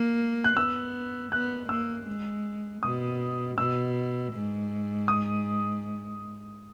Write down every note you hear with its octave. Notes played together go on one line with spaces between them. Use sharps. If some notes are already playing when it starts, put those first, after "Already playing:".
Already playing: A#3
F#6
B3 E6
B3 F#6
A#3 E6
G#3
B2 D#6
B2 E6
G#2
D#6